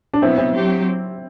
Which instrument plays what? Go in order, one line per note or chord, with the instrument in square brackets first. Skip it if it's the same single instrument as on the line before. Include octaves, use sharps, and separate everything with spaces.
[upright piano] D4
[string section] B2 F#3 B3 [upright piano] C4 E4
[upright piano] C4 E4
[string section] F#3 C4 G4